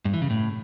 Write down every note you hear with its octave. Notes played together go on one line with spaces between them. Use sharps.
G2
E3
C#3
A2